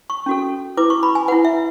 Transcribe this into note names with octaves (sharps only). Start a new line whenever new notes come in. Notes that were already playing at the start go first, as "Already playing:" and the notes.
C#6
C#4 F#4 A4
E4 B4 D6
C#6
B5
G#5
E4 B4 F#5
E5